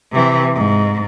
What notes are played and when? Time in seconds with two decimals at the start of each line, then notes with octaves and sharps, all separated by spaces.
0.12 C3 E3
0.54 G#2